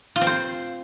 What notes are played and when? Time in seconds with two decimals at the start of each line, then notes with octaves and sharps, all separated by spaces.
0.16 F4
0.21 C4
0.27 C5